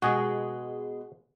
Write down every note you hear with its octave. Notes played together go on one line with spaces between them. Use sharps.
B2 G#3 F#4 G#4